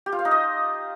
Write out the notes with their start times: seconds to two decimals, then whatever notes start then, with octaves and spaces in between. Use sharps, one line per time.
0.06 G4
0.12 F4
0.19 F5
0.25 D#4
0.31 D#5